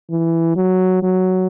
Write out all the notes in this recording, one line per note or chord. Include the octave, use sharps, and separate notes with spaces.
E3
F#3
F#3